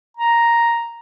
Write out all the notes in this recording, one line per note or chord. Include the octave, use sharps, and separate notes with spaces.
A#5